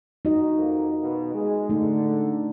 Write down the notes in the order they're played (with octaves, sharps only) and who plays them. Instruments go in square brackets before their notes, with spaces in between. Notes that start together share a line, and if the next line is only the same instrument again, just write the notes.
[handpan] D#4 F#4 D#5
[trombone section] F2 A#3
B2
G#3
[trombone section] D3 [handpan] A3 D#4